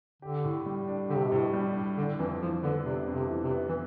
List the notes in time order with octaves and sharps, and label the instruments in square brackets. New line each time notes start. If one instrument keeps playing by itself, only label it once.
[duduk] D3 [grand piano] G4
[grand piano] A2
G3
D4
[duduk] D3 [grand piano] G4
[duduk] C3
B2
[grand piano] A2 [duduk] C3
[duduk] B2
[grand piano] G3
D4
[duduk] D3 [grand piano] D4
[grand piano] F2 [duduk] E3
[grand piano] E3 [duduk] F3
[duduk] D3 [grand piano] B3
[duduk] C3 [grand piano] D4
[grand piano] F2
[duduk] C3
[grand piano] E3
[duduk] C3
[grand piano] B3
[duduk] E3